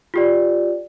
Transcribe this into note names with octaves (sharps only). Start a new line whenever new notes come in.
F4 G4 D5